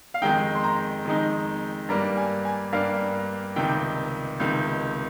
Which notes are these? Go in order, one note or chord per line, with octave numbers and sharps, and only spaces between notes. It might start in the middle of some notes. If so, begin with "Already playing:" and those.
F5
F2 D#3 G#3 D#4 G5
C6
A#5
F2 D#3 G#3 D#4
G2 G3 A#3 A#5
G#5
G#5
G2 G3 A#3 F5
C#2 C3 D#3 G5
C#2 C3 D#3